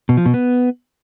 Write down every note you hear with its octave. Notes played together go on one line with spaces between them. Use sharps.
B2
F3
B2
B3